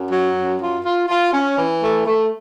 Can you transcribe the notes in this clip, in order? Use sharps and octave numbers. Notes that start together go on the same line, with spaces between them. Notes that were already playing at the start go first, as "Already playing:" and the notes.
Already playing: F#2
F#3
F#2
F4
F4
F4
C#4
E3
A3
A3